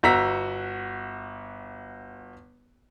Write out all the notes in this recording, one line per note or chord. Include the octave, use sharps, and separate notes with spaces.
G1 F#4 A#5 E6 B6